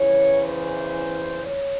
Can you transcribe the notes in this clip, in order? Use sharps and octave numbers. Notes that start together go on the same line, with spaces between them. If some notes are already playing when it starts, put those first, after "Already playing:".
Already playing: E2 C#3 E3 C#5
C5
C#5